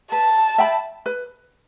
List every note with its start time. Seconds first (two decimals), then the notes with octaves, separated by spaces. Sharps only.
0.12 B4 A5
0.58 E5 G5 B5
1.06 B4